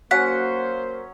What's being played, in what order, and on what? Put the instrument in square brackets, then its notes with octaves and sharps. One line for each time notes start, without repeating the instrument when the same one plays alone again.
[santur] F#3 C#4 [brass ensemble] A#3 C5 [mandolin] F#5 [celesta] B6